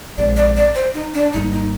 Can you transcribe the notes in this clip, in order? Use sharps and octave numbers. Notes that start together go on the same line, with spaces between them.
A#1 A#2 G#3 C4 D5
D5
D5
C5
D#4
D4
G#1 G#2 G3 A#3 D#4
D#4